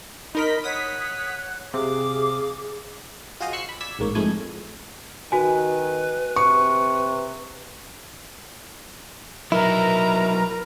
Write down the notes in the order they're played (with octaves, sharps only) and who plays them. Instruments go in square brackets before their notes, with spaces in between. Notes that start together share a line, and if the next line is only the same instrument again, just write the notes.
[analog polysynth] D#4 A#4 B6 [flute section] D#5 B5 C6
[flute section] C#5 F#5 F#6 [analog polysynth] D#6 B6
[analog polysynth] C3 [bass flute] G#4 [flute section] F5 D6
[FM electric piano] F4 F#4 G#4 C5 D#5 F5
C5 C#6 E6 F#6 C7
B5
D5 E6 G#6 B6
A1 G#2 A#3 C#5
F2 G#2 G#3 A3 E4 G#5
[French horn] D#3 [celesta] F#4 G#5 [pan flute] B4
[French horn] C3 [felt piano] C#6
[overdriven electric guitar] F#3 D#4 [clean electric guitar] E4 [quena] A#4 [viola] B4 A#5